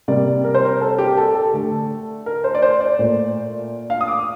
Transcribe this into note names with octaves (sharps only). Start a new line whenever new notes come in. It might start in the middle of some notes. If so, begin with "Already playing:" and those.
C3 G3 A#3 D5
A#4
C5
A#4
A4
G4
A4
A4
D3 A3
A#4
C5
D5
C5
D5
A#2 A3
F5
D#6
D6